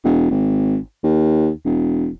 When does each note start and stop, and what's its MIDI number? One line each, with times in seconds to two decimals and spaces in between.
0.04 0.28 28
0.31 0.78 32
1.04 1.50 39
1.65 2.09 28